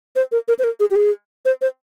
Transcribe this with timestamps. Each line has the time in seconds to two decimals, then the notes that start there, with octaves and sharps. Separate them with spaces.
0.16 C5
0.32 A#4
0.48 A#4
0.59 C5
0.64 A#4
0.80 G#4
0.91 G4
0.96 G#4
1.45 C5
1.61 C5